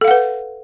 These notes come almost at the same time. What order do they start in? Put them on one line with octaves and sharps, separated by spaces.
A4 F5 F#5 B4